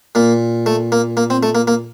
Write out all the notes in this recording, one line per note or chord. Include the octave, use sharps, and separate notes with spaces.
A#2 A#3
A3
A#3
A#3
C4
A3
A#3
A#3